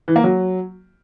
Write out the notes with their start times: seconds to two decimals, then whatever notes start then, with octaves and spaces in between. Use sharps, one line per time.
0.08 E3
0.16 A#3
0.24 F#3